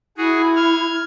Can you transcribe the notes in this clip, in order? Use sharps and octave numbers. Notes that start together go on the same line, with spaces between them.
E4 F#4 G#4
F6 G#6